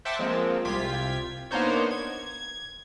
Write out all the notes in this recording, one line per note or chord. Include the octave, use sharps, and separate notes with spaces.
C5 E5 F#5 G5 A5 D6
F3 G#3 A#3 C4
C2 F4 G4 G#6 B6
A#3 B3 D4 D#4 C5 C#5
G#6